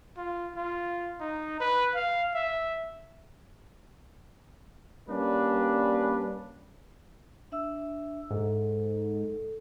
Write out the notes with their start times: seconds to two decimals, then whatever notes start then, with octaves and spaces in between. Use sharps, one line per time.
0.17 F4
0.56 F4
1.20 D#4
1.60 B4
1.95 F5
2.34 E5
5.08 G3 A#3 C#4 D4 B4
7.52 D4 E5 E6
8.31 G#2 A4